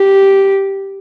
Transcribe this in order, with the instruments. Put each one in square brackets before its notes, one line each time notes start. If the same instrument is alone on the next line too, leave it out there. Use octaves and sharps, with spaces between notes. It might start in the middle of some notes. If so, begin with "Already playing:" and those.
Already playing: [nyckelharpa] G4